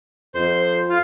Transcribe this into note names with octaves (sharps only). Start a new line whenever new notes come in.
F2 C5 C6
F4 F5